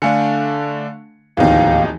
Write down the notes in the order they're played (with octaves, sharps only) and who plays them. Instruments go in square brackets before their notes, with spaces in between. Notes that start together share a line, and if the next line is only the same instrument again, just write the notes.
[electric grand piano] D3 A3 D4 [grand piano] F5 G#5 C#7
[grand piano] D1 D#2 [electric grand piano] E3 F3 D#4 [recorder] F5